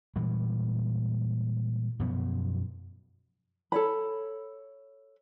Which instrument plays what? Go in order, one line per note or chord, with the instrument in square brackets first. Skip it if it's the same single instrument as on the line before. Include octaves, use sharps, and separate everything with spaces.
[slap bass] A#2 E3 G3 G#3
F#2 B2 F3 B3
[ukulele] A4 C#5 B5